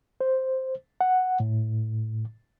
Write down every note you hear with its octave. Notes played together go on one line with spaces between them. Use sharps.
C5
F#5
A2